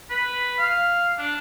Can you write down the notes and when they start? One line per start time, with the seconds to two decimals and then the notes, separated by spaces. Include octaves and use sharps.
0.10 B4
0.59 F5
1.18 D4